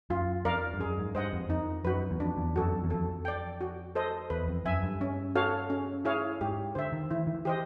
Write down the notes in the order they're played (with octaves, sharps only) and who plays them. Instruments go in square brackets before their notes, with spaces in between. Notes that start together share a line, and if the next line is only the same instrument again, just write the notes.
[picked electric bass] F#2 [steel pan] F4
[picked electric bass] F2 [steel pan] A#4 D5 F5
[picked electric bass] G2
[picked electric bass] F#2 [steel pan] G#4
[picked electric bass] G#2
[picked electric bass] G2 [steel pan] C5 D#5 F#5
[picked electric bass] F2
[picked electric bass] F2 [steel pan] D#4
[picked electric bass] F#2 [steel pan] F#4 B4
[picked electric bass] E2
[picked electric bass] F2 [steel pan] D4
[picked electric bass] E2
[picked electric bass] F#2 [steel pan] F#4 A4
[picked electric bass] F2
E2
[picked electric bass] F2 [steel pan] A4
[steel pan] D5 G5
F#4
A4 C5 D#5
[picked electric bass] E2 [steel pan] B4
[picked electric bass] F2
[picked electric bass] F#2 [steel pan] E5 G#5
[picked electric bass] G2
[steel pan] C#4
F#4 A4 C#5 F5
C#4
E4 G#4 C#5 F5
[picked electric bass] G#2 [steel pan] G4
[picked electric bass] D3 [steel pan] C5 E5
[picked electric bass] D#3
[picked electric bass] E3 [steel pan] E4
[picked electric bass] D#3
E3
[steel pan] G4 C5 D#5